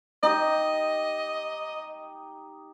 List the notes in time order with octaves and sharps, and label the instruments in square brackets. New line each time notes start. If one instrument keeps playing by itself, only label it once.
[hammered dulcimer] D#4 G4 [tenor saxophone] D#5